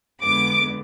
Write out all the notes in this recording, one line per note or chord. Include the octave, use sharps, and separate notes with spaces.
F2 D3 G#3 B3 D6